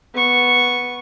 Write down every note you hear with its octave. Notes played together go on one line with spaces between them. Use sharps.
B3 C#6